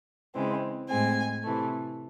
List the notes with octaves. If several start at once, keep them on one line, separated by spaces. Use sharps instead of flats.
C#3 E3 G#3 C4
A2 G#3 C4 G#5
C3 E3 A3